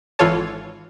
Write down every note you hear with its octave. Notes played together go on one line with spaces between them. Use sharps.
G#1 E3 F4 A4 C#5 A5